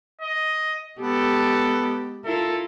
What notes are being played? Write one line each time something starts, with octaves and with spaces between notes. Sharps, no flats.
D#5
G#3 B3 G4 A4
E4 F4 A4 A#4